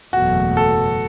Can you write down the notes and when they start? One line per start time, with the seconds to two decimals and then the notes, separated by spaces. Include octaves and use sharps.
0.13 F#1 E2 B2 F#3 A3 F#4
0.57 A4